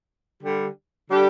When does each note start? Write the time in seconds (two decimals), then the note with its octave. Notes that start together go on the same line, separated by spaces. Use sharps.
0.42 D3 G3 D4 G4
1.10 D3 G3 D4 G4